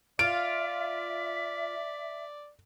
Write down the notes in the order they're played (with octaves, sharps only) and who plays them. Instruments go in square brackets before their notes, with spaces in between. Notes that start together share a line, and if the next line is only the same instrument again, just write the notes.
[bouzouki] F4 [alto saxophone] D5 [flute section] E5 [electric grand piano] D7